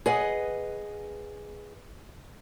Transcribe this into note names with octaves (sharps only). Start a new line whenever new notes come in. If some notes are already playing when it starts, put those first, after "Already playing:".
G#4 B4 D#5 F#5